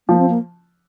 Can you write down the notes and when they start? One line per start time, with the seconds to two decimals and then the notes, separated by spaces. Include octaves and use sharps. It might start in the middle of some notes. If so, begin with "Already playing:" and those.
0.08 F3 A#3
0.19 C4
0.29 A#3